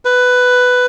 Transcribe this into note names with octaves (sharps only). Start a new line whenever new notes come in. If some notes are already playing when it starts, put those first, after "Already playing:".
B4